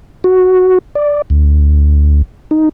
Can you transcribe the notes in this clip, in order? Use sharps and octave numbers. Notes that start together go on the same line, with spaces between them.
F#4
D5
D2
D#4